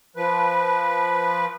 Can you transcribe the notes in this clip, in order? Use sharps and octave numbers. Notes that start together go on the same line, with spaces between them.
F3 B4